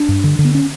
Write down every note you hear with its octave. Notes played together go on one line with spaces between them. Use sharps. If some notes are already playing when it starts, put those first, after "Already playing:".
Already playing: D4
G2
D3
D3
B3
C#4